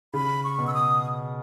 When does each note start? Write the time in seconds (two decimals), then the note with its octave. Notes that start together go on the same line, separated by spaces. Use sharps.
0.14 C#3 B5
0.44 C#6
0.59 B2
0.67 E6
0.74 D#6